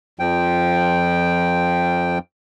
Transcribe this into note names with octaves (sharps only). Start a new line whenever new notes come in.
F2 F3 G5